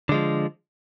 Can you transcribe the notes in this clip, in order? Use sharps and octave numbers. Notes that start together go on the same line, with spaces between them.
D3 F3 G#3